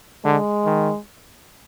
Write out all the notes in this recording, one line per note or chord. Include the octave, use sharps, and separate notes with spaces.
D3 G#3
D#3